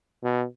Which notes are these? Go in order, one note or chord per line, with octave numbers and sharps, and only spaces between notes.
B2